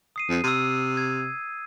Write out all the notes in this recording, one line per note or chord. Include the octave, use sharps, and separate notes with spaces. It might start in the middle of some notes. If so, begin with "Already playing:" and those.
D#6 C7 D#7
F2
C3 E6 D#7
G#6